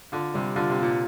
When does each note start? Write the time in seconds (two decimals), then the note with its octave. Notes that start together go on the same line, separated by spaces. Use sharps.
0.12 D3 F4
0.34 C3 G3
0.56 D3 F4
0.70 C3
0.79 A#2 F4